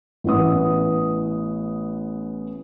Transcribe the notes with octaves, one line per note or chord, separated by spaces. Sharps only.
A1 E3 B3 D#6